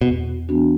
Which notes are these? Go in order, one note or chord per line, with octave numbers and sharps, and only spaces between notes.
E2 B2
E3 B3 D4 F#4